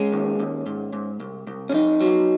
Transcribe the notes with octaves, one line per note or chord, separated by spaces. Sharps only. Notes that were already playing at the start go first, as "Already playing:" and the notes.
Already playing: G#3 C#4
D#2
D#2
G#2
G#2
C2
C2
C#4
F2 D#4
F#3